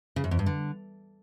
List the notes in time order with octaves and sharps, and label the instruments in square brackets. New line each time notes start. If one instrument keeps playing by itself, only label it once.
[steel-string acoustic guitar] C#3
F#2
F2
G2
D3